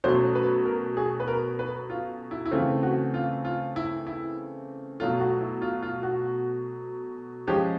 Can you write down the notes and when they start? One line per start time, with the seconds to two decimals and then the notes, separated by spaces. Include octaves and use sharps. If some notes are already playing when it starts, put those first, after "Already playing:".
0.04 B2 F#3 A3 C#4 C5
0.35 B4
0.66 A#4
0.97 G#4
1.20 B4
1.28 A#4
1.59 B4
1.90 F4
2.31 E4
2.46 E4
2.51 C#3 E3 A3 C4 F4
2.83 F#4
3.14 F4
3.45 F4
3.76 E4
4.07 E4
5.00 B2 F#3 A3 F4
5.20 F#4
5.41 E4
5.62 F4
5.82 F4
6.03 F#4
7.47 F3 G#3 C#4 G4